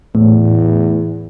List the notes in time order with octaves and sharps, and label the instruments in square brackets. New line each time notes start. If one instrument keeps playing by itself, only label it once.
[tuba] E2 [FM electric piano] A2